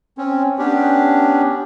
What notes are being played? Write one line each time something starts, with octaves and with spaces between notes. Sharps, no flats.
C4 C#4
B3 C#4 D4 G4